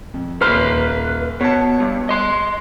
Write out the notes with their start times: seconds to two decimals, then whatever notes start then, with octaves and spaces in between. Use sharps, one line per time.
0.14 F2
0.41 D#1 B4 B5 C6 F6
1.41 B2 C#5 A5
1.80 G2
2.09 D#5 C6